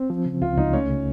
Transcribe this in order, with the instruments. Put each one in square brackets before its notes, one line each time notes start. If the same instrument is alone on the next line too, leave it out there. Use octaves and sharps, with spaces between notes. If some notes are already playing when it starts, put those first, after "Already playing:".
Already playing: [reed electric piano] C4
F3
C#3
[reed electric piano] C#2 [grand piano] F4
[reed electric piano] C#2 [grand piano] D#4
[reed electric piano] A3 [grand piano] C#4
[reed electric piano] C#3